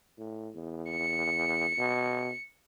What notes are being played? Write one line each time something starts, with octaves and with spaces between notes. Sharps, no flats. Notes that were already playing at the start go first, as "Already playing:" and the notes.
A2
E2
C#7
B2